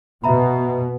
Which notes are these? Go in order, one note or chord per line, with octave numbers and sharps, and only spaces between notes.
B2 E5 A#5 B5